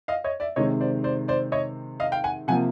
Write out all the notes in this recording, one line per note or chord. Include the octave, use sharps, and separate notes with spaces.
D#5 F5
C#5 D#5
D5 E5
C3 D#3 G#3 C4 C#5 D#5
C5 D5
C5 D5
C5 D5
C#5 D#5
D#5 F5
F5 G5
F#5 G#5
C3 F3 A#3 F#5 G#5